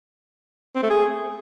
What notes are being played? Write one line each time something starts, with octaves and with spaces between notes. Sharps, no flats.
C4
A3
G#4